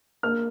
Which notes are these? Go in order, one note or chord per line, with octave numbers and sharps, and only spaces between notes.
A#3 F6